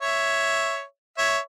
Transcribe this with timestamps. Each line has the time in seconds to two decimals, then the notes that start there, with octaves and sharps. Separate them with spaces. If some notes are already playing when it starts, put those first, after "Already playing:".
0.01 C#5 E5
1.18 C#5 E5